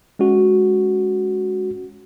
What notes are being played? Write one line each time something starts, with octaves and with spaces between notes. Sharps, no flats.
G#3 C#4 F#4